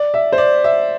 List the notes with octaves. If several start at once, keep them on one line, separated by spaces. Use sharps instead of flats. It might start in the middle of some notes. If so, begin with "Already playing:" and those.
Already playing: D5
E5
C5
D5
E5